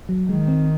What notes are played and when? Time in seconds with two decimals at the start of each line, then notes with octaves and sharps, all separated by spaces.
0.09 F#3
0.29 D#3 G#3
0.48 C4